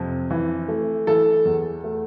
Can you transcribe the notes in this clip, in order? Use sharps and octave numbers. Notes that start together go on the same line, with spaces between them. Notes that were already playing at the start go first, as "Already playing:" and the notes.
Already playing: F2 C3
E3
A3
E3 A4
E2
A3